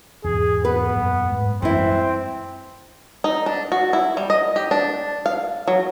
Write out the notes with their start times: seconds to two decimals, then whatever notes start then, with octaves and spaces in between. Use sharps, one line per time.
0.24 E2 G#2 B2 G#4
0.65 B3 B4
0.96 F#2 A#2
1.32 G#2 A3
1.62 F#2 E3 G3 G#3 C4 E4
3.24 D#4
3.46 D4
3.72 F#4
3.93 E4
4.17 G3
4.30 D#5
4.56 G4
4.71 D4
5.26 F5
5.68 F#3